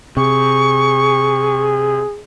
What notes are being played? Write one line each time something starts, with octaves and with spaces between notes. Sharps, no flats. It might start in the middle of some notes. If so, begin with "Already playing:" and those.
C3 G#4 C#6